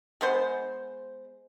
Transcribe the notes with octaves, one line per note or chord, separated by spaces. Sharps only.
G#3 B3 C5